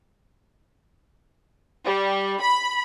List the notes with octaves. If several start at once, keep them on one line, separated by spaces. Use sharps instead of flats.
G3
B5